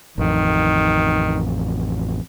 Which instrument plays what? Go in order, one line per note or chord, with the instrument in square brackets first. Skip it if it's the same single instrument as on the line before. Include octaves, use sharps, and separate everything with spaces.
[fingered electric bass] A1 F2 [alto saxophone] D#3